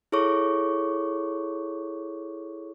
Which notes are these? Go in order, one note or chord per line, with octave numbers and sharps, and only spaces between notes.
E4 G#4 A4 C#5 C#6 D6